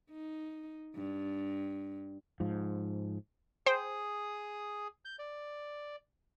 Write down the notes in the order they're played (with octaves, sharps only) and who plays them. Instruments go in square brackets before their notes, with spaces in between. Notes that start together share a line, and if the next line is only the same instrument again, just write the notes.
[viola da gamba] D#4
G2
[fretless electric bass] G#2 F3
[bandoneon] G#4 D#6 [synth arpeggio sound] C5 G5
[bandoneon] G6
D5